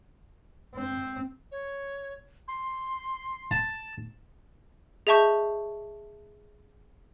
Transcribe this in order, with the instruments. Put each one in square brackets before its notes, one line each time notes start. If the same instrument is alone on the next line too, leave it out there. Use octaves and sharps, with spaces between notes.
[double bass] C4
[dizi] C#5
C6
[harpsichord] A5
[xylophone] G#4 D#5 E5 A5 C#6 G6